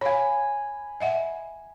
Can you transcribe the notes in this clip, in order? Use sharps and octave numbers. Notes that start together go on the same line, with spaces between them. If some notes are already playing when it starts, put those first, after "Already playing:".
C#5 F5 G#5 B5
D#5 E5 F#5